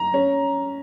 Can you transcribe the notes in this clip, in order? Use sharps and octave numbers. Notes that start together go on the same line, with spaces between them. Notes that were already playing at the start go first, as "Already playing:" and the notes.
Already playing: A#5
C#4